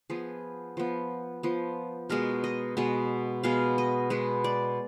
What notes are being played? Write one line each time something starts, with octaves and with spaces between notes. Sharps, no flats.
F3 B3 G#4
F3 B3
F3 B3
B2 G#3 B3 A#4
D#5
B2 G#3 B3
B2 G#3 B3 F5
D#5
B2 G#3 B3 B4
D5